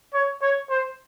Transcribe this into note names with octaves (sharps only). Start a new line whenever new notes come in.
C#5
C#5
C5